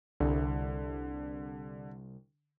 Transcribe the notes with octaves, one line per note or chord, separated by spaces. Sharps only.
C2 D3